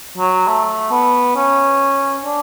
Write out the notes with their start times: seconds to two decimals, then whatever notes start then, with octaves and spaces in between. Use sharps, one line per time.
0.18 F#3
0.48 A3
0.91 B3
1.36 C#4
2.25 D4